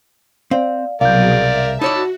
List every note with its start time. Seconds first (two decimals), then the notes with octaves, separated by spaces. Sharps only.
0.51 C4 D5 F5
1.01 C2 B2 F#3 G#4 A#4 D5 F5 G6
1.36 E5
1.81 D#4 F#4 C#5 D5 A5 B5 E6